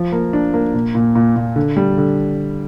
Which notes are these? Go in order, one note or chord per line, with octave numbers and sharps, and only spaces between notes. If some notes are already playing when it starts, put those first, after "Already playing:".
Already playing: F3
A#3
D4
A#3
A#2
A#2
A#2
A#2
D3
G3
D3